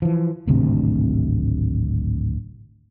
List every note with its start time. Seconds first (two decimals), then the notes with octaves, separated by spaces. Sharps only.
0.02 E3 F3
0.47 D1 G#1 D2 C3